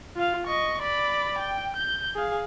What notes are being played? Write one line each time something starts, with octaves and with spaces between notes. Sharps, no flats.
F4 F5
D#5 C#6
D5 B5
G5
G6
G#4 F5